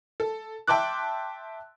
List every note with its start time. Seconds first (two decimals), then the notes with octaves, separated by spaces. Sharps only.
0.20 A4
0.67 E5 G5 A5 C6 D6 F#6